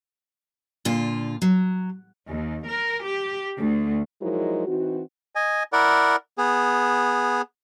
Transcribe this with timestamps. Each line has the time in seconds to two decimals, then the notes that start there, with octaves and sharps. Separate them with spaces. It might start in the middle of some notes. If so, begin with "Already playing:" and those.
0.85 A#2 D3 F4
1.42 F#3
2.27 D#2
2.66 A#4
3.03 G4
3.58 D2
4.21 F3 F#3 G#3 D#4 E4 A#4
4.67 E3 C4 D#4 F#4
5.35 D#5 G#5
5.73 E4 A#4 D5 F#5
6.38 B3 G#4